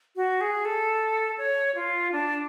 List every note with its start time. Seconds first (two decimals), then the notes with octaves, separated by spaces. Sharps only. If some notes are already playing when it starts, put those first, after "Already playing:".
0.16 F#4
0.41 G#4
0.65 A4
1.38 C#5
1.75 F4
2.12 D4